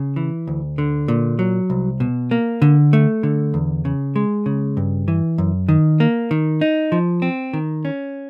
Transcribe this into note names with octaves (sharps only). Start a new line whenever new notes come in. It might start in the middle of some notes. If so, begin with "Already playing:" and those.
Already playing: C#3
E3
D2
D3
A#2
F#3
C2
B2
A#3
D3
A3
D3
E2
C#3
G#3
C#3
G2
E3
F#2
D#3
A#3
D#3
D#4
F3
C4
D#3
C#4